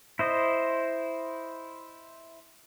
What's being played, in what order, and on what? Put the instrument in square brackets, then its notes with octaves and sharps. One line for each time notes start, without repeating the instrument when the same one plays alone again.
[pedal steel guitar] E4 C5 D#5